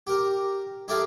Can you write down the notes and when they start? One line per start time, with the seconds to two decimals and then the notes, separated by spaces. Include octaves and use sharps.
0.07 G4 A#4
0.88 D#4 E4 G4 A4 A#4 F5